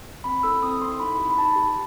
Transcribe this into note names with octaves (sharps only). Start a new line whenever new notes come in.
C4 B5
E4 A4 E6
C4 D#6
E4 A4 C6
D#4 B5
G4
B5
D#4 A5
G4